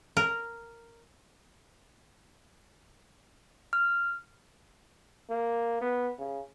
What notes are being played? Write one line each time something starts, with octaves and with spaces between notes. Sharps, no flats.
A#4
F6
A#3
B3
C#3